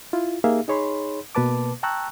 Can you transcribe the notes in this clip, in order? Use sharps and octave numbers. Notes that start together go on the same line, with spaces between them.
E4 F4
A#3 D#4 G4 G#4 E5 F5
D#4 G#4 C#5 B5 C6
B2 A#3 B4 A5 D6
G5 A5 A#5 C#6 E6 F#6